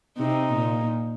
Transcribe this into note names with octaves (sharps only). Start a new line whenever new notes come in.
C3 D#4
A#2